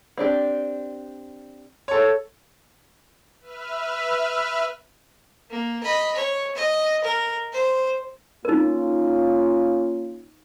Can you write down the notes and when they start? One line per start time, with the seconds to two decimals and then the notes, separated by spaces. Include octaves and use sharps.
0.18 C4 D4 G4
1.88 A4 C#5
3.41 B4 E5 F6
5.50 A#3
5.83 D#5 B5
6.15 C#5
6.56 D#5
7.04 A#4
7.53 C5
8.45 A#3 C#4 D#4 F4 A#4